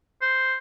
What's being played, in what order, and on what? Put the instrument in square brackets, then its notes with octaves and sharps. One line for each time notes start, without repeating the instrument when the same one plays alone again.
[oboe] C5